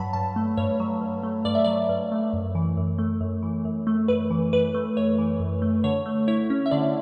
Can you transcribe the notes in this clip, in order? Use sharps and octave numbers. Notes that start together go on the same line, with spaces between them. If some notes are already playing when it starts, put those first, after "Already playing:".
Already playing: G2 F#3 C#5 F#5 A5 B5
G2 A5
A3
G2 C#5
F#3
G2
A3
G2 D5
E5
F#3 D5
G2
A3
F#2
E3
F#2
A3
F#2
E3
F#2
A3
F#2 B4
E3
F#2 B4
A3
F#2 C#5
E3
F#2
A3
D3 C#5
A3
E4 C#5
C#4
E5
D3 D5